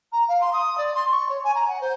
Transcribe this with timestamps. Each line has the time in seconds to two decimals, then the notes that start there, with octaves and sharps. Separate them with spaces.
0.12 A#5
0.28 F5
0.40 C6
0.52 D#6
0.77 D5
0.94 C6
1.11 C#6
1.28 C#5
1.43 G#5
1.55 A#5
1.67 F#5
1.80 C5